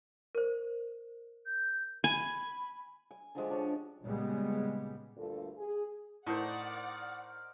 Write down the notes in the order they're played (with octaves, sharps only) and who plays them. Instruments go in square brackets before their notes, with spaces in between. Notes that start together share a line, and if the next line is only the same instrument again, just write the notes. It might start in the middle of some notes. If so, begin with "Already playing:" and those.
[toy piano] A#4 C5
[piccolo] G6
[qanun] G#5 [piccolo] B5
[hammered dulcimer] G#5
D3 F3 G#3 G4
F3 D4 C#5
[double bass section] A#2 C#3 G3 G#3 B3
[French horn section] D2 G2 A#2 D3 F4 A4
G#4
[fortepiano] A2 [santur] D#4 A#4 C5 [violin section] D5 F#5